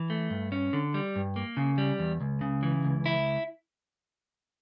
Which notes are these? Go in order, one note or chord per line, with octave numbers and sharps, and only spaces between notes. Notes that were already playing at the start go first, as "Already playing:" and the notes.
Already playing: E3
A3
G2
C#4
D3
G3
G2
A#3
C#3
G3
E2
C#2
C#3
E3
C#2
E4